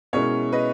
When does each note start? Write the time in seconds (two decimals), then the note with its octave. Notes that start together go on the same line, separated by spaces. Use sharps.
0.13 B2 G#3 C#4 E4 A#4 C#5
0.52 B4 D#5